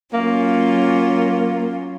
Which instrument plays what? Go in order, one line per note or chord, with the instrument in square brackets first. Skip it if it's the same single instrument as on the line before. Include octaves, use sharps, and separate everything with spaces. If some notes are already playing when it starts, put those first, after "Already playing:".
[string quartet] F#3 C#4 F4 [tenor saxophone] A#3